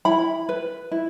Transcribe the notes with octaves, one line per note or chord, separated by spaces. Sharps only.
E4 B5
B4
E4